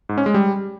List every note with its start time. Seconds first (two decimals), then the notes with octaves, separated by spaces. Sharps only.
0.09 G#2
0.18 C#4
0.26 G#3
0.34 G3